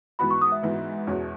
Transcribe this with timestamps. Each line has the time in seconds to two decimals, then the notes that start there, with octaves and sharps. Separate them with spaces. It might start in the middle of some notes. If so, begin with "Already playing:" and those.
0.19 G#2 E3 B3 F#4 B5
0.31 C#6
0.42 D#6
0.52 E5
0.63 G#2 E3 B3 F#4
1.07 E2 B2 G#3 C#4 F#4